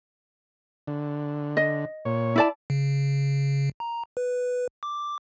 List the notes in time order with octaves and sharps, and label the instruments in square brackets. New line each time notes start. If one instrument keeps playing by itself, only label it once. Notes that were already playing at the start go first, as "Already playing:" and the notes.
[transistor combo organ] D3
[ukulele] D#5
[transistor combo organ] A#2 C#5
[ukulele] E4 D5 A5
[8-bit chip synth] C#3
A#5
B4
D6